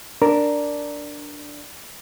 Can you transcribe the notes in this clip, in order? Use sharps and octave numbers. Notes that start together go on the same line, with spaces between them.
D4 A#4